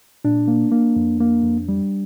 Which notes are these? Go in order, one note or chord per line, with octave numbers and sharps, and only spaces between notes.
A#2 D4
A#3
A#3
F2
A#3
F2
G3